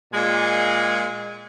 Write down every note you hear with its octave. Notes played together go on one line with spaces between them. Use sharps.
A#2 G#3 G#5